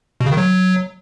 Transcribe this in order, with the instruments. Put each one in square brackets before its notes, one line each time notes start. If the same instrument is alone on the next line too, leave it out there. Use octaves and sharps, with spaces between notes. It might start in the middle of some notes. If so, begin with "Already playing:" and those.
[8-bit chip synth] B2
C#3
D#3
F#3